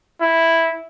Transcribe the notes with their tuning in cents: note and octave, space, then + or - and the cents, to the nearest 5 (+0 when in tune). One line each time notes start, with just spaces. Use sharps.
E4 -5